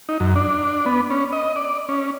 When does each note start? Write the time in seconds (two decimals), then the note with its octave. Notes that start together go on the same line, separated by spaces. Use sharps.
0.09 D#4
0.20 F#2
0.36 D4
0.86 B3
1.10 C#4
1.33 D#5
1.56 D5
1.89 C#4